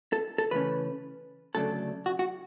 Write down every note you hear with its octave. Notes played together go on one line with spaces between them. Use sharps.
A4
A4
C#3 E3 A3 C#4 B4
D2 C#3 F#3 A3 D4 A4
F#4
F#4